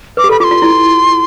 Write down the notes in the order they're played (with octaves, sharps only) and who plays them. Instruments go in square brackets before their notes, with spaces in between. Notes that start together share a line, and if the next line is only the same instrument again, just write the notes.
[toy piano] B4 [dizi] D6
[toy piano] G4
[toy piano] A4 [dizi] B5
[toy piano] F4 [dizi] D6
[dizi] C6
[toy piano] F4
E4